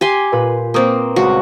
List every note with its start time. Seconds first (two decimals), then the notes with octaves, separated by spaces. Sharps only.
0.01 G4 G#5 C6
0.32 A#2 B4
0.74 A#3 C4 C#6 D#6 G6
1.16 C#2 F#4